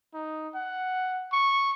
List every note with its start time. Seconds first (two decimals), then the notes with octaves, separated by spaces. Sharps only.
0.14 D#4
0.54 F#5
1.32 C#6